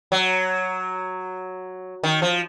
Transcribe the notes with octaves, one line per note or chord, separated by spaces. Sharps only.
F#3
D#3
F3